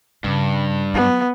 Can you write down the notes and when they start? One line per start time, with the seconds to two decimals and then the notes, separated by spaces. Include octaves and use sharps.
0.24 G2 C#3
0.94 F#3 B3